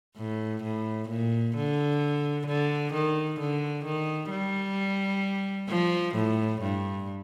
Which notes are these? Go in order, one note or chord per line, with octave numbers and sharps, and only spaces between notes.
A2
A2
A#2
D3
D3
D#3
D3
D#3
G3
F3
A2
G2